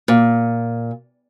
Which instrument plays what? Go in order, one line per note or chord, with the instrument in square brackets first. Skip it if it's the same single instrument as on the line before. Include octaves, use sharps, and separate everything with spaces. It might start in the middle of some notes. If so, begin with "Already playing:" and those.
[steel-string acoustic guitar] A#2